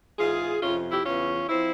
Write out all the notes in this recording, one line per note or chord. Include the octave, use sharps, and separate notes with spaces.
G#2 E3 F4 G#4
F2 C3 F3 C#4 F4
E4 G4
E2 C#3 E3 C#4 F4
F3 C4 E4